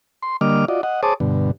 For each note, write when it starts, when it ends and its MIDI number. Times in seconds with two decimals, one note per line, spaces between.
0.23 0.37 84
0.41 0.65 50
0.41 0.65 55
0.41 0.65 58
0.41 0.65 75
0.41 0.65 86
0.41 0.65 89
0.68 0.81 65
0.68 0.81 66
0.68 0.81 74
0.68 0.81 75
0.83 1.01 75
0.83 1.01 78
1.03 1.14 68
1.03 1.14 72
1.03 1.14 73
1.03 1.14 81
1.03 1.14 86
1.03 1.14 87
1.20 1.51 43
1.20 1.51 47
1.20 1.51 50